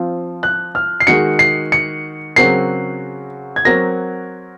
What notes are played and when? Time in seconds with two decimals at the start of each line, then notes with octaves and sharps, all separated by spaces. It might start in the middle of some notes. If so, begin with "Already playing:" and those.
Already playing: F3 C4 F4
0.43 F#6
0.75 F6
1.00 C7
1.07 D#3 G#3 D#4 F#4 C#7
1.39 C7
1.72 C#7
2.36 C#3 F#3 C4 F#4 A#4 C7
3.56 G#6
3.65 F#3 C4 F#4 A#4 A#6